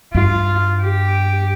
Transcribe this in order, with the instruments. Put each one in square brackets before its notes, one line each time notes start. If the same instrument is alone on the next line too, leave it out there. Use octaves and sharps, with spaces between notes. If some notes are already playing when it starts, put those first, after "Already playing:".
[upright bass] G2 [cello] F4
[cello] G4